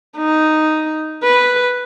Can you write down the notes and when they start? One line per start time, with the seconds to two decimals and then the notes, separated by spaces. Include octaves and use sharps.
0.17 D#4
1.24 B4